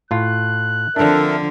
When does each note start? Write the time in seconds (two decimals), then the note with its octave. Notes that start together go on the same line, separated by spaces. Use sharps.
0.11 A2 F4 F#6
0.96 D3 F3 C4 D4 A4 A#4 E5